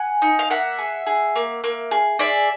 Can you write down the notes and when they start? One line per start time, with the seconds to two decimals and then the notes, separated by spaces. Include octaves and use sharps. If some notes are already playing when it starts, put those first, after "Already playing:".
Already playing: F#5 G#5
0.22 D#4
0.39 F5
0.50 A#3 E5 F#5
0.78 G#4
1.06 G#4
1.36 A#3
1.64 A#3
1.91 G#4
2.19 G#4 D5 E5